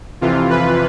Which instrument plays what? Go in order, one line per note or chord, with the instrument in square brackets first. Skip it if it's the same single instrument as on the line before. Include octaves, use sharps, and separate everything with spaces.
[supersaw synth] F2 C3 E3 F4
B4